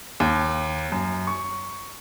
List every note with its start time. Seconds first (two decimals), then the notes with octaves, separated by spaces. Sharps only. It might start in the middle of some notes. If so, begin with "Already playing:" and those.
0.20 D#2
0.92 F#2
1.27 C#6